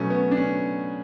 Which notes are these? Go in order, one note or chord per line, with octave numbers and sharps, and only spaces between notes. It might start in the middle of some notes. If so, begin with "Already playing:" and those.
Already playing: B2 F#3 A3 C#4
B3
D4
C#4